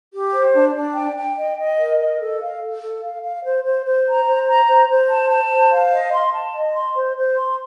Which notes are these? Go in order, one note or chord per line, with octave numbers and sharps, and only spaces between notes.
G4
C5
D4
D4
G5
G5
D#5
D#5
A#4
D#5
A4
F5
A4
A4
F5
F5
C5
C5
C5
A#5
C5
A#5
C5
C5
A5
A5
C5
F5
D#5
C6
A5
D#5
C6
C5
C5
C6